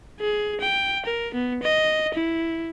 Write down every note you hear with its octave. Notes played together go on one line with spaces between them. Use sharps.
G#4
G5
A#4
B3
D#5
E4